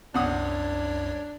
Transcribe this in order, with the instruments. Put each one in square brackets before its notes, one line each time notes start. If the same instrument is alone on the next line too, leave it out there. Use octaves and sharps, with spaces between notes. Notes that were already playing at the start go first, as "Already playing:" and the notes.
[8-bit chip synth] C2 F#2 C#5 [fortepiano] C3 F#5 D#6 [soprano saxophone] D4